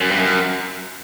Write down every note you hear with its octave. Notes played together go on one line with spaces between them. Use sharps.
F#2
G2
F#2